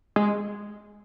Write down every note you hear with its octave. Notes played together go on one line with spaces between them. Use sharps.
G#3